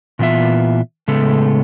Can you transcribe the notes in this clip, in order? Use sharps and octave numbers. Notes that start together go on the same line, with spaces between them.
A#2 E3 B3 F4 E5
A2 C#3 G#3 A3 B3 A4